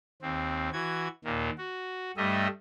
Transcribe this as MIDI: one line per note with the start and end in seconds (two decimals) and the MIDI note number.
0.22 0.70 39
0.22 0.70 60
0.73 1.08 52
0.73 1.08 66
0.73 1.08 92
1.25 1.50 39
1.25 1.50 46
1.25 1.50 51
1.58 2.11 66
2.17 2.47 43
2.17 2.47 55
2.17 2.47 57
2.17 2.47 75
2.17 2.47 76